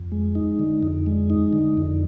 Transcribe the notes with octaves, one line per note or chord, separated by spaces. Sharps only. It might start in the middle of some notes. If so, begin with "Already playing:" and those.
Already playing: F2
G#3
D#4
D3
F2
G#3
D#4
D3
F2